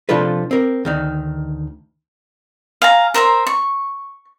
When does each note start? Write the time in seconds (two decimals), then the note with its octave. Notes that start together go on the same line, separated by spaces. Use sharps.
0.09 C3 F3 D4 F4 A4 B4
0.51 C4 A#4
0.85 D2 D#3 D#4
2.82 F5 G#5 A#5
3.14 A#4 C5 E5 A#5
3.47 C#6